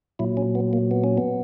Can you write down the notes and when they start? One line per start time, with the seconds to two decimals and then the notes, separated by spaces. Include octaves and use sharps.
0.19 A#2 F#3 E4
0.37 C#4
0.55 B3
0.73 A#3
0.91 B3
1.04 C#4
1.18 B3